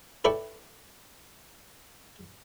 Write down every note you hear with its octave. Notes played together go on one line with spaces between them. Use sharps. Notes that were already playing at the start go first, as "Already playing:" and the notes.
E4 A4 B4 D5 G5 C#6